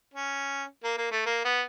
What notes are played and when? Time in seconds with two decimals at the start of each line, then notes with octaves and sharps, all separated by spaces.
0.14 C#4
0.84 A#3
0.97 A#3
1.12 A3
1.26 A#3
1.45 B3